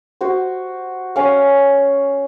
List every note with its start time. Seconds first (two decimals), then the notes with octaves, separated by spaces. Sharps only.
0.21 F#4 C5
1.16 C#4 F5